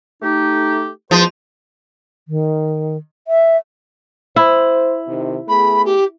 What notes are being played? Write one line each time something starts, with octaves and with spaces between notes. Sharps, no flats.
A3 D#4 G4
E2 F3 G#3 C5
D#3
E5
E4 C5
C3 D#3
A3 B3 G#4 B5
G4